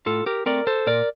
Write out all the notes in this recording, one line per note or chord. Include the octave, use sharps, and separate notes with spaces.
A2 F4 A4
G4 A#4
A3 C4 A#4 D5
A4 C5
A#2 A#4 D5